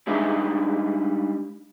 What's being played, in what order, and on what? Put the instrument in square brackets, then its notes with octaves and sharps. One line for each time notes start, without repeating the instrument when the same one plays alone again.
[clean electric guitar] G3 G#3 D4 D#4 B4 E5